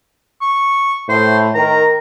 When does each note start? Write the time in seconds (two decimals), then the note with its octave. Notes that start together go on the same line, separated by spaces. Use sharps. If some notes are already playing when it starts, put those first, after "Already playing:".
0.41 C#6
1.09 A2 C5
1.55 D#3 A#4 A#5